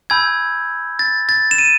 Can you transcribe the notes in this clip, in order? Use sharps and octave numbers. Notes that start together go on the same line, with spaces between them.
G#5 B5 E6 G6 G#6
A6
A6
E7
D#7